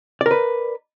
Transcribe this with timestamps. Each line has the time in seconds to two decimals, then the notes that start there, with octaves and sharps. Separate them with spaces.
0.21 D5
0.26 A#4
0.31 B4